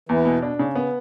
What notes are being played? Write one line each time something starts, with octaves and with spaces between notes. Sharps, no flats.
E2 E3
B2
D4
C#3
B3